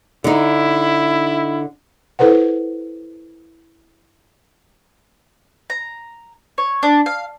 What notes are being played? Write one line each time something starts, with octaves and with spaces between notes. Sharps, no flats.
D3 D#4 E4
E4 A4 B4 C5 F#5
A#5
C#5
D4
F5